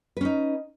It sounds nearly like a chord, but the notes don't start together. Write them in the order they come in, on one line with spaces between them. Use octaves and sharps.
B4 C#4 D#4